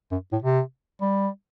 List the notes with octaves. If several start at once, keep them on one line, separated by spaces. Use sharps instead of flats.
F#2
A2
C3
G3